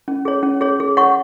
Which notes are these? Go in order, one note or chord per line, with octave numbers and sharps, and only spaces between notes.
C#4
G#4 C#5
C#4
G#4 C#5
G#4
C#5 F#5 C#6